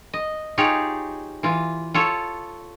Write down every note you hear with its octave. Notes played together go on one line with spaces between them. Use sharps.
D#5
D#4 F4 G4 G#4 C#5 F5
E3 F4
F4 A4 C#5